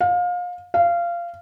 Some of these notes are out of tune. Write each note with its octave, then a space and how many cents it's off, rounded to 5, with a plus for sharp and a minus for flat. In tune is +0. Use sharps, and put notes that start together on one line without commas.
F5 +30
F5 -20